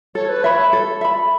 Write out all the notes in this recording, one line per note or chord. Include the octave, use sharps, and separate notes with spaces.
A4 C#5
B4
C#5 E5 B5
A4
E5 B5